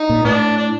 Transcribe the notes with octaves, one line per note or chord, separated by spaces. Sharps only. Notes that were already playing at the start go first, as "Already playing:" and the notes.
Already playing: D#4
A#2
A2 B3 D4
D4